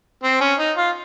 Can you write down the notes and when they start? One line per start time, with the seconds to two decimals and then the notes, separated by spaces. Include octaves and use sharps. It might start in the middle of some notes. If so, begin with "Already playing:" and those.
0.24 C4
0.41 C#4
0.59 D#4
0.77 F4